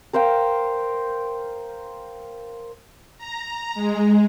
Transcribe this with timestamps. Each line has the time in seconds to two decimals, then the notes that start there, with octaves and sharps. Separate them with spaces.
0.13 A#4 C5 F5 G5
3.18 A#5
3.74 G#3